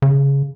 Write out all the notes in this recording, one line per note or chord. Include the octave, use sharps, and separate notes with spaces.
C#3